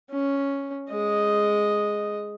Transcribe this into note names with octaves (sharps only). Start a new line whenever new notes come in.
C#4
G#3 D#5